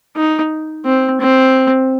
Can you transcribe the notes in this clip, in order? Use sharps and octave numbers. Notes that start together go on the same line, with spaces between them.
D#4
C4
C4